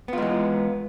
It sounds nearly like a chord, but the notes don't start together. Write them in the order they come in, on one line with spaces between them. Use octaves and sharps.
B3 F4 G#3 E3